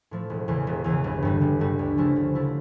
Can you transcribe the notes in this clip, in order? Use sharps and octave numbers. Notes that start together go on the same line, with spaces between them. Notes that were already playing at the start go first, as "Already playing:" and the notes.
A2 F3 A3
E1
E2 C#3 E3
E1
E2 C#3 E3
G1
G2 D3 G3
G1
G2 D3 G3
D2
C#3 F3 A3 E4
D2
C#3 F3 A3 E4